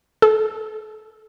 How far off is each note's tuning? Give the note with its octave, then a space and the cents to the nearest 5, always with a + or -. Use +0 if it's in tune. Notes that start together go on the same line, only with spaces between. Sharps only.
A4 -30